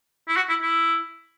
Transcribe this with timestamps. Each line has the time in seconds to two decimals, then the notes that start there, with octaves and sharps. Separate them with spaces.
0.28 E4
0.36 F#4
0.49 E4
0.62 E4